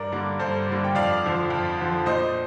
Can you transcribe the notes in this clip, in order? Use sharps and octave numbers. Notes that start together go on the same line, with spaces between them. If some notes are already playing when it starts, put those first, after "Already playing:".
Already playing: G2 A#4 D5
D3 G3 A#3
G2 A4 C5
D3 G3 A#3
G5
F2 D5 F5
D3 F3
F2
D3 F3
A#2 C5 D#5